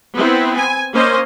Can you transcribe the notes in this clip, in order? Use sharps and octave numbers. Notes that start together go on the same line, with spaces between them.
B3 C4 E4
G#5
A#3 C#4 C5 D#5